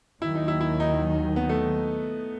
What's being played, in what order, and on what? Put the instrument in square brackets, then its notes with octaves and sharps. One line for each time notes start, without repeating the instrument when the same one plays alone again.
[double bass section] D#2 D#3 F#3 [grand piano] E4
[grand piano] D#4
E4
E4
D#4
B3
A3